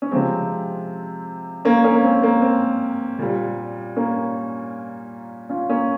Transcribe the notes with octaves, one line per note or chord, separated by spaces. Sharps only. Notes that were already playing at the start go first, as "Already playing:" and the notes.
C#4
C3 F3 G#3 C4
A#3 C#4
A#3 C#4
A#3
C4
A#3
C4
A#2 G3
A#3 C#4
C#4 F4
A#3 C#4